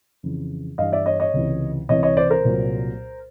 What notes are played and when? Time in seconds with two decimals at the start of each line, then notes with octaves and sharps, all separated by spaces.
0.23 F2 C#3 E3
0.78 G2 E3 D#5 F5
0.92 D5 E5
1.06 C#5 D#5
1.20 C#5 D#5
1.34 C#2 C3 E3
1.89 C2 C3 E3 C#5 D#5
2.03 C#5 D#5
2.17 C5 D5
2.30 A#4 C5
2.45 C2 A#2 F#3